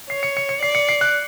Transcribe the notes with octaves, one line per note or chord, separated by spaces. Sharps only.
C#5 C7
C#7
C#7
C#7
D5 C7
C#7
C7
F#6